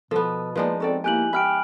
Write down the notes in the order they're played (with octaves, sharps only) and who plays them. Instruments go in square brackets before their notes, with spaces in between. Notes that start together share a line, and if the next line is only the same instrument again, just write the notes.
[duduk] B2 [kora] F3 B3 [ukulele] A4
[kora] F3 G#3 D#4 [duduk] A#3 [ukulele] B4 D5 A5
[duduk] C4 [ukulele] F#4 A4 D5
[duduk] A#3 [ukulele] E4 G4 [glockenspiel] G#5 F#6 F#7
[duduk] G4 [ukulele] E5 [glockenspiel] B5 F6 D7